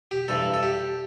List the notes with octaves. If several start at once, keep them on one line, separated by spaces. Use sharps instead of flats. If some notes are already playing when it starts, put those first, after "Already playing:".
G4
G2 E3 A4
A4
G4